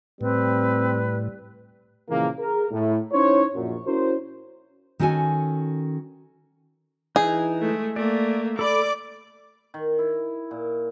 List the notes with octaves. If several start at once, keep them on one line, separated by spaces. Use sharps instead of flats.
A2 G3 C4 B4
A#2 C#3 E3 F3 G#3 A#3
G#4 A#4
A2
C#4 D#4 E4 C5 C#5
A#1 F#2
C#4 E4 F#4 A#4 C5
D#3 C#4 F#4 A4 G#5
E3 D#4 G#4
G#3 A3
A3 A#3 D5
A4 D5 B5 D6
D#3
E4
A#2